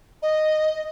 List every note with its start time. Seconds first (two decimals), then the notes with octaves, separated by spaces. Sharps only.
0.22 D#5